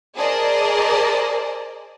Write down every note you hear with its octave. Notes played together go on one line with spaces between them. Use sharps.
G#4 A#4 C5 D5 D#5 A5